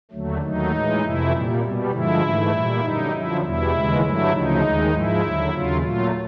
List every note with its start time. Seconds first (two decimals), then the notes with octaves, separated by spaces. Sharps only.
0.11 D#2 D3 F#3 A3
0.41 D#2 D#3 F#3 A3 D#4
0.71 A2 E3 G#3
1.01 F2 C3 E3 A3 E4
1.31 A#2 G3
1.61 B2 G3
1.91 G2 D3 F3 G#3 E4
2.21 G#2 E3 A3
2.51 A#2 G3
2.81 F#2 D3 G3 D#4
3.11 F#2 D3 F3 E4
3.41 E2 B2 G3 E4
3.72 D#2 C#3 E3 G#3
4.01 G2 D3 F#3 A3 E4
4.31 D2 C#3 F3 D#4
4.61 D#2 D#3 G#3
4.91 G#2 F3 G#3 E4
5.21 D#2 D3 F#3
5.51 D#2 C#3 F#3 F4
5.80 A#2 F#3 A3 F4